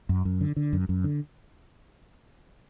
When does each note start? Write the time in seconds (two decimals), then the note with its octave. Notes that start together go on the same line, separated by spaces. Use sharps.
0.09 F#2
0.25 F#2
0.41 D3
0.56 D3
0.73 F#2
0.89 F#2
1.04 D3